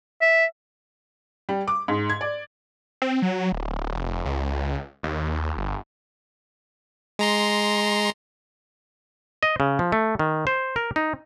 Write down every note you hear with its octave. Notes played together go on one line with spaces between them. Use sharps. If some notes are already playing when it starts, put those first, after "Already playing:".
E5
G3
D6
G#2
G#6
D5
C4
F#3
D1
F1
C#2
D#2
G1
G#3 A#5 C6
D#5
C#3
F3
A3
D#3
C5
A#4
D#4